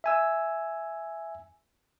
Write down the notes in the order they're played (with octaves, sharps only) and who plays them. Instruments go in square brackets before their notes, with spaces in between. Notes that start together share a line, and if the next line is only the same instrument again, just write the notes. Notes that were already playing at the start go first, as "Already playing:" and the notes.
[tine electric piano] E5 G#5 E6